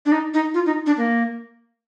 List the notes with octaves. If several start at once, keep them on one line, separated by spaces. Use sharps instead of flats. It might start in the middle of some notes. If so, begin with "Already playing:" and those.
D4
D#4
D#4
F4
D#4
D4
A#3